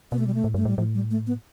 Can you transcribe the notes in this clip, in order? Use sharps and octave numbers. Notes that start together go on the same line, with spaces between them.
B2 B3
A3
G3
A3
A2
G2 A3
A2 G3
A2 F3
G3
A3
B3